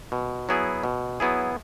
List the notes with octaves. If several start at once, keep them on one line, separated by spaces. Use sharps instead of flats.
B2
F#3 B3 E4 G#4
B2
F#3 B3 E4 G#4